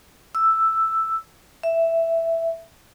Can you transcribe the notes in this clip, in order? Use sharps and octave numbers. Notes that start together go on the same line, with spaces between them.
E6
E5